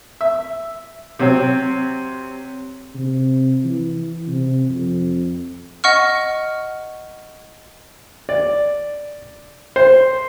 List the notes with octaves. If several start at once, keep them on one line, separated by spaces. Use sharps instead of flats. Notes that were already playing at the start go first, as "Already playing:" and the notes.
E5
C3 F#3 C4
C3
E3
C3
F2
D#5 F#5 C#6 F6
D5
C5